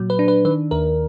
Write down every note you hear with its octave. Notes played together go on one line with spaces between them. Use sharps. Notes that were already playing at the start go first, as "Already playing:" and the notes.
Already playing: A#2 F#3
B4
D4
B4
D#3 B4
D#2 A#4